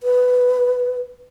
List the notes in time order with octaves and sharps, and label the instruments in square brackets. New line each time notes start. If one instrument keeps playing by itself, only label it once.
[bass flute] B4